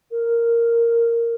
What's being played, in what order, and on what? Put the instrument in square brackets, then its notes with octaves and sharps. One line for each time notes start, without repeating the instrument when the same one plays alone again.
[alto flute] A#4